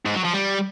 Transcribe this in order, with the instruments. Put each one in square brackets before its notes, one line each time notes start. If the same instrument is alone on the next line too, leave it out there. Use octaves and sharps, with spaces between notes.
[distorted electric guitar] G#2
F#3
F3
G3